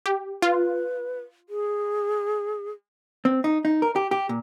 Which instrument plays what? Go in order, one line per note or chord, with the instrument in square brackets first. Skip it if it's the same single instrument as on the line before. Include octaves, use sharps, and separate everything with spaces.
[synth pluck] G4
[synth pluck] F4 [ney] B4
[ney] G#4
[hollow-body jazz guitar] C4
D#4
D#4
A#4
G4
G4
A#2